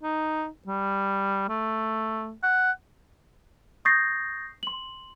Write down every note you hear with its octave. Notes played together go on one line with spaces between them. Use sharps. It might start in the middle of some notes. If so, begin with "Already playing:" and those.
D#4
G3
A3
F#5
C#6 D#6 G6 A6 A#6 C7
C6 F#7